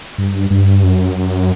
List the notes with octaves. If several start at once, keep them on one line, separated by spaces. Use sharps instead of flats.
G2
G2
F#2